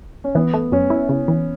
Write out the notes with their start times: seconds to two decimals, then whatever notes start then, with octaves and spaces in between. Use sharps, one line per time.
0.24 C#4
0.35 E3 B3
0.54 A3
0.72 F#2 C#4
0.90 E4
1.09 C#3
1.28 E3